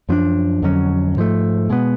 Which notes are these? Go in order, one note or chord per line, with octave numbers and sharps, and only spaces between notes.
F#2 F3 B3 D4
F2 D3 F#3 C#4
G#2 F3 A3
B2 G#3 B3